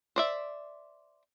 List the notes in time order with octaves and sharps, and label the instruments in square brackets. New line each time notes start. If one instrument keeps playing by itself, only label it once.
[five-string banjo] C5 D5 E5